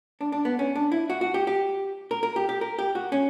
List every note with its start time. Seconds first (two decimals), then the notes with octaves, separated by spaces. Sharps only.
0.21 D4
0.32 D4
0.45 B3
0.59 C#4
0.76 D4
0.92 E4
1.10 F#4
1.21 F#4
1.34 G4
1.47 G4
2.11 A#4
2.23 A#4
2.36 G4
2.49 G4
2.61 A#4
2.79 G4
2.95 F#4
3.12 C#4